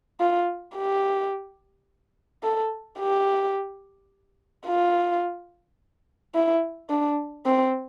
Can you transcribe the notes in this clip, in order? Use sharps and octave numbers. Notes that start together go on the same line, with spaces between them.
F4
G4
A4
G4
F4
E4
D4
C4